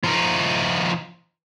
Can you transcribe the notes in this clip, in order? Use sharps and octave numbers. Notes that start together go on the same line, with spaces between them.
F3 D#4